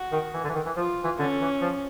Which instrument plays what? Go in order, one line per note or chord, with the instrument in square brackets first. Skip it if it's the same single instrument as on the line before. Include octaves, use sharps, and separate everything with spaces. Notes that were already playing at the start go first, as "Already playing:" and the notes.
Already playing: [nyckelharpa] F#4
[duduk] D#3
E3
D3
E3
D#3
E3
[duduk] F3 [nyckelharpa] F4
[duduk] E3
[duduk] D3 [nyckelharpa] C#4
[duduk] E3
F3